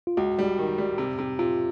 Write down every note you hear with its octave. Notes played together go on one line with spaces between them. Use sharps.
F4
C#2 F#4
G3
D#3
G3
C3
C3
C3 F4